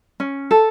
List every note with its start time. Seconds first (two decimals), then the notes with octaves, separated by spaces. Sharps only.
0.20 C#4
0.51 A4